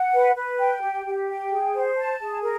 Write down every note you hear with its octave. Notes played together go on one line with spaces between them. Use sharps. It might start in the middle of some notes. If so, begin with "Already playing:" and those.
Already playing: F#5
B4
B4
G5
G4
G4
G5
G#4
C5
A5
G#4
A#4